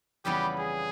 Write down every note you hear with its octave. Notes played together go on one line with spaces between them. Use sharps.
F2 C#3 E3 G3 B3 G4
G#4